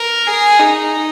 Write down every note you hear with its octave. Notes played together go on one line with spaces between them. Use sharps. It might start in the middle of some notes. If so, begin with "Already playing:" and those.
Already playing: A#4
G#4
D#4